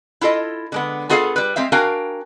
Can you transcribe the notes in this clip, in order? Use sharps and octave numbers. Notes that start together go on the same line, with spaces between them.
E4 F4 A4 D#5
D3 G#3 B3
B3 F4 G#4 A4 D#5 F5
G3 B4
G#3 C4 E5 F5
D4 F#4 A#4 F5 G5 G#5